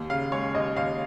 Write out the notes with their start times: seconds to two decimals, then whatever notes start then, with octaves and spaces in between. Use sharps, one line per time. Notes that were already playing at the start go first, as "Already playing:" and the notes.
Already playing: D#2
0.10 C#3 F5
0.32 G#3 C#5
0.54 D#2 D#5
0.76 D#2 F5